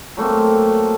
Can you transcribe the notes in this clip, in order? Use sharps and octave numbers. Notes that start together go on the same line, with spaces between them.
F#3 A3 A#3 C4